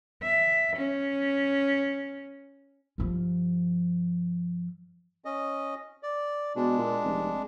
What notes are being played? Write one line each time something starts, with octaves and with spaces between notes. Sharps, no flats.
E5
C#4
G2 F3
C#4 D#5
D5
B2 G#3 D4
A#2
F1